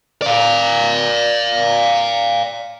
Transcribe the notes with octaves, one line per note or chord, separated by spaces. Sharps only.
D5 F5